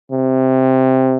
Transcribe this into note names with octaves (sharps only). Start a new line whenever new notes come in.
C3